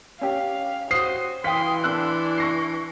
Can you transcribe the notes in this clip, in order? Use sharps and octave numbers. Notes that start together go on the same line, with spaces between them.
C#4 G4 F5
F#4 C5 D#6 C7
E3 F5 G5 C6 D#6 B6
D4 C6 E6 F#6
C#6 A#6 C7